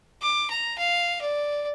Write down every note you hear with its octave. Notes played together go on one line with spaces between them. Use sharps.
D6
A#5
F5
D5